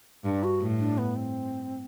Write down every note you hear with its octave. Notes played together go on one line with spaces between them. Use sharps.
G2 D4
F#4
A2
D4
B3
C4